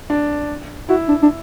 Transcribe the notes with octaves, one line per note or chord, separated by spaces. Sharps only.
D4
E4 F#4
D4
D4